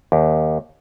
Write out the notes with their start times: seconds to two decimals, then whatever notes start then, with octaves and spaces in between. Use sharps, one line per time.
0.12 D#2